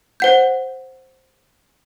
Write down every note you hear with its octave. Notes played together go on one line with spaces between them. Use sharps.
C5 F#5 G6